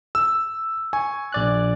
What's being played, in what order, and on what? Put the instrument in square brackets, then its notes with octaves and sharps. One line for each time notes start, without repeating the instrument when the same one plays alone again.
[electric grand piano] E6
[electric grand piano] G#5 [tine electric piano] C#6
[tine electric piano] A#1 D5 F#6